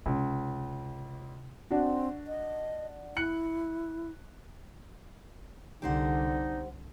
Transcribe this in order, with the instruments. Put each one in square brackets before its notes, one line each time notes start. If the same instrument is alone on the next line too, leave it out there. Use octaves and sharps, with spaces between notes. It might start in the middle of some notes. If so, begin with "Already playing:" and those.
[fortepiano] C#2 [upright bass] C3
[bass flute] C4 [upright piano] D4 F#4
[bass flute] D#5
[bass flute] E4 [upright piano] F#6 C#7 F#7
[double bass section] C2 D3 [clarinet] D#4 [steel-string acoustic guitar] G4 C5 F#5